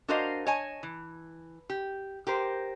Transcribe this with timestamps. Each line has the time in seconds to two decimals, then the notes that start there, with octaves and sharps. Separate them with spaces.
0.08 D4 F#4 A#4 C5 D#5 F5
0.47 C#5 D#5 G#5 A5
0.83 E3
1.70 G4
2.27 G4 A#4 C5